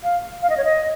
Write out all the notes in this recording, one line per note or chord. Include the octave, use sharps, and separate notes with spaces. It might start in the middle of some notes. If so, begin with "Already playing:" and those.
F5
F5
D#5
C#5
D#5